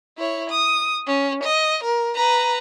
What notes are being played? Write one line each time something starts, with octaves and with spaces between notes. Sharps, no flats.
E4 C#5
D#6
C#4
D#5
A#4
B4 A#5